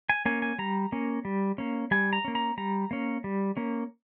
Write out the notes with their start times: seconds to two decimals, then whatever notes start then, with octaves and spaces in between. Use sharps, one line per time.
0.09 G#5
0.26 A#3 C#4 G#5
0.42 G#5
0.59 G3 A#5
0.92 A#3 C#4
1.25 G3
1.58 A#3 C#4
1.91 G3 G#5
2.13 A#5
2.24 A#3 C#4
2.35 A#5
2.58 G3 A#5
2.91 A#3 C#4
3.24 G3
3.57 A#3 C#4